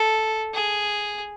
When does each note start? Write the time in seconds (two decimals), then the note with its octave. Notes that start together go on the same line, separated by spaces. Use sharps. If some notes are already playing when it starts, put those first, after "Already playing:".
Already playing: A4
0.54 G#4